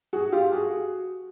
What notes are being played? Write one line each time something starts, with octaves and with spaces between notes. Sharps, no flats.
F#4 G#4
F4 G4
F#4 G#4